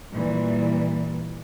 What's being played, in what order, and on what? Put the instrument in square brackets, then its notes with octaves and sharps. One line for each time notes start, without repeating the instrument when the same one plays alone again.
[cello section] A#2 E3 G3